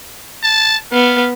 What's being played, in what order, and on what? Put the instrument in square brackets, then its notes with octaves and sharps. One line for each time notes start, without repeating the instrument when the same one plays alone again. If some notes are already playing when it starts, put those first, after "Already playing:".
[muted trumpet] A5
[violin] B3 [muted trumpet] F5